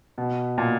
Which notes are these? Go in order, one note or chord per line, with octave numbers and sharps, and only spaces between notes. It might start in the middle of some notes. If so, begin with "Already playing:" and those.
B2
A#2